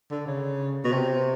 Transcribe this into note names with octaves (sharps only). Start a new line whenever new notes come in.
D3
C#3
B2
C3